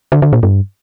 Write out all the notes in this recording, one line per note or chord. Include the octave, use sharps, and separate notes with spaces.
D3
D3
A#2
G2